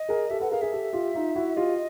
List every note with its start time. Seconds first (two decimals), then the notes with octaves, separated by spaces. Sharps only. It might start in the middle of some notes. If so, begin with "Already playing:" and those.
Already playing: D#5
0.09 G#4 A#4
0.30 G4 A4 E5
0.40 A4 B4 F#5
0.51 G#4 A#4 F5
0.61 G#4 A#4 E5
0.72 G4 A4
0.93 F4 G4
1.14 D#4 F4
1.35 E4 F#4
1.56 F4 G4 D#5